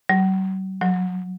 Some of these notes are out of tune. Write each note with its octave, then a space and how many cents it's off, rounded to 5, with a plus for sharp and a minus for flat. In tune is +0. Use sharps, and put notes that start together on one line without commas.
F#3 +45
F#3 -20